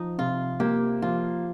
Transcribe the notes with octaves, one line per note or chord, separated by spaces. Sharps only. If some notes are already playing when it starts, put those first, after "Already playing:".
Already playing: F3 D#4
C3 F4
A#3 G4
F3 F4